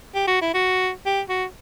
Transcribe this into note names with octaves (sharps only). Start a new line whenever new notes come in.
G4
F#4
E4
F#4
G4
F#4